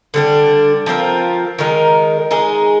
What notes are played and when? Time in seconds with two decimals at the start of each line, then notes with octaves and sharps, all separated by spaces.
0.14 D3 G3 D4
0.86 F3 C4 F4 A#4
1.59 D#3 G#3 D#4 A#4
2.31 G#3 D#4 G#4